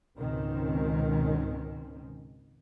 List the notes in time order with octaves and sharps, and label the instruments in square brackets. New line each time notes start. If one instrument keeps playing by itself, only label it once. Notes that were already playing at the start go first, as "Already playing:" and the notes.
[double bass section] C#2 G#2 B2 D#3 C4 C#4